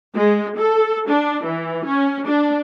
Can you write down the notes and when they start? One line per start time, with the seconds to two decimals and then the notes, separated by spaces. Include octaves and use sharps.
0.15 G#3
0.57 A4
1.08 D4
1.45 E3
1.86 C#4
2.26 D4